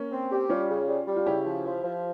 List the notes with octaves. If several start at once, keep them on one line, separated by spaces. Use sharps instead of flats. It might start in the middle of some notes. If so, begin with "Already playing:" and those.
Already playing: A#3 C#4
C4
G4
G3 C#4 F4
C#3
G3
G3
F4
C#3 E4 G4
F3
F3
F3